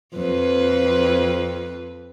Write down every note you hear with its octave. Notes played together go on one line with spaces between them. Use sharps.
F2 B4